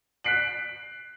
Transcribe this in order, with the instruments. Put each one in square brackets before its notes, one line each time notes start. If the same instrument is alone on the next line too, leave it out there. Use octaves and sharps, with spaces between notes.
[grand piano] F#6 B6 C7 D7 F#7